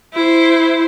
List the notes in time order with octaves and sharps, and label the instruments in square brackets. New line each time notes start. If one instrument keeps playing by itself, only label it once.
[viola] E4 C5